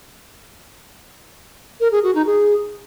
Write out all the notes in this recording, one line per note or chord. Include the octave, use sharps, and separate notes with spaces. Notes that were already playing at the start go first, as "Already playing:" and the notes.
A#4
G#4
F#4
D#4
G#4